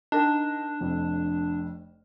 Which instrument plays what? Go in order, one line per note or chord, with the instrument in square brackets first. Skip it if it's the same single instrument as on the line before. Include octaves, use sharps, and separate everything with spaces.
[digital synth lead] D4 [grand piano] D#4 A#4 G5
[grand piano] F1 F2